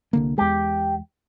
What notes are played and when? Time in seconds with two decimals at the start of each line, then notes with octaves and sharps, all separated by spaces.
0.13 C2 D3 A#3
0.38 E2 G#3 G4